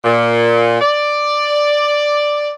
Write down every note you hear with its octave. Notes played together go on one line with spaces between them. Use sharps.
A#2
D5